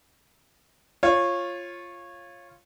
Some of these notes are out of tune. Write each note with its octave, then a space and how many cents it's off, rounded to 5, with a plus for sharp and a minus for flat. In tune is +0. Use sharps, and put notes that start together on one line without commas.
F4 -5 C#5 -20